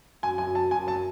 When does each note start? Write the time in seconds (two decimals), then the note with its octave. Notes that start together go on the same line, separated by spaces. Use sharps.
0.23 F#2 G#5
0.38 F#2 G#5
0.54 F#3 A5
0.71 F#2 G#5
0.87 F#3 A5